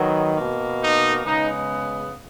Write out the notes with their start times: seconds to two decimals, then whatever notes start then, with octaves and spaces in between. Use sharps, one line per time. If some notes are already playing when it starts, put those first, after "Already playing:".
Already playing: D#3 F#3 B3
0.37 B2 A#3
0.82 D#4
1.25 C#3 G#3 B3 D#4